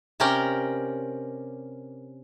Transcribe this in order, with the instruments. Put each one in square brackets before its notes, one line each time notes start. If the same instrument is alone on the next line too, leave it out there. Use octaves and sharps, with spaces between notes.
[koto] C3 C#4 G4 A#4 D5 G5